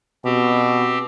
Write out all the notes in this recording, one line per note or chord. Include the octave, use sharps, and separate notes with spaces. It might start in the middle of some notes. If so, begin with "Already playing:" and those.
B2 C4 G4